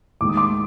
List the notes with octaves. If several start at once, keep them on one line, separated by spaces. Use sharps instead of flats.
D#2 D#3 G#3 D6
D#6
C6 D6